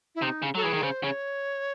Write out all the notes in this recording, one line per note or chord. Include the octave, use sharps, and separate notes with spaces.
E4
C3 D#4
C#3
F#3 A4
E3 G#4
D#3
C#3 C5
C#3 C#5